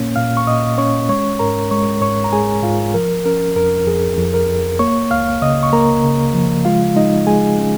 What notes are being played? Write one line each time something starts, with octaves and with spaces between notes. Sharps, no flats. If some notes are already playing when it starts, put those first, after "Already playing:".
Already playing: A#2 A#3 C#4 C#5
A#2 F5 F6
C#6
A#2 D#5 D#6
C#4 C#5 C#6
G#3 C#5 C#6
G#2 A#4 A#5
G#3 C#5 C#6
G#2 C#5 C#6
A#5
G#3 G#4 G#5
G#2 F4 F5
F3 A#4
C#4 A#4
F2 A#4
F2 G#4
F2
A#4
F2
A#3 C#5 C#6
C#2 F5 F6
C#3 D#5 D#6
C#6
A#3 A#4 A#5
C#3
F3
G#3 F4 F5
G#3 D#4 D#5
G#3 G#4 G#5
C#4